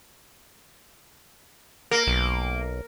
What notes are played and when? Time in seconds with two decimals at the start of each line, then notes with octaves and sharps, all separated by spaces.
1.91 A#3 A#4
2.07 B1